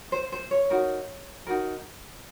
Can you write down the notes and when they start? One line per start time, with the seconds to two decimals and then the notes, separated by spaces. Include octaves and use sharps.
0.12 C5
0.32 C5
0.51 C#5
0.70 D#4 F#4 A#4
1.47 D#4 F#4 A#4